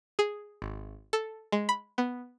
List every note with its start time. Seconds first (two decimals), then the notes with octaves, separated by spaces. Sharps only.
0.19 G#4
0.62 G#1
1.13 A4
1.52 G#3
1.69 B5
1.98 B3